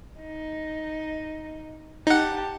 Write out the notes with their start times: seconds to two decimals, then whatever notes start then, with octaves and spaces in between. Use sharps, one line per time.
0.21 D#4
2.07 D#4 G4 F#5 A5